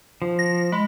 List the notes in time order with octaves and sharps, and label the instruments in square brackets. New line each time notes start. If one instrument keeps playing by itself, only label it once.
[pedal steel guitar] F3
[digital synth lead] A#6
[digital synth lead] G#3 [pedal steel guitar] B5